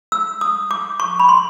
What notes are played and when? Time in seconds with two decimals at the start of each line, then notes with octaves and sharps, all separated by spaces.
0.12 E6
0.41 D#6
0.71 D6
1.00 C#6
1.20 B5
1.29 C6